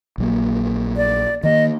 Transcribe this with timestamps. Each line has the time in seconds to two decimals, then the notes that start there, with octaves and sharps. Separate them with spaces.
0.18 A#1 F#3 A#3
0.97 D5
1.43 D#3 A#3 D#5